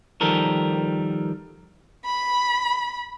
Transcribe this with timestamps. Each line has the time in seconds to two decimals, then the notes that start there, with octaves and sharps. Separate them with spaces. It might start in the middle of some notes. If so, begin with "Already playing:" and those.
0.21 D#3 F3 G3 A4 A#4
2.05 B5